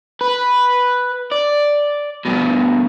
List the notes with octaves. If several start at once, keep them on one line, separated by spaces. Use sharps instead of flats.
B4
D5
G2 B2